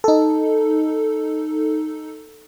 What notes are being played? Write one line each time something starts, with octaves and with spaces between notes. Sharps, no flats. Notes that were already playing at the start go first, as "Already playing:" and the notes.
D#4 A4